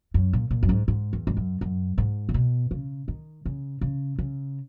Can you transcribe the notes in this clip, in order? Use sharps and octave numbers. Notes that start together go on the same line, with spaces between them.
F#2
A#2
A#2
F#2
G#2
G#2
E2
G#2
F#2
F#2
G#2
C#3
B2
C#3
D#3
C#3
C#3
C#3